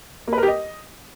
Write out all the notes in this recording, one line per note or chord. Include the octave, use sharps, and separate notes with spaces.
A#3
B4
A#4
G4
D#5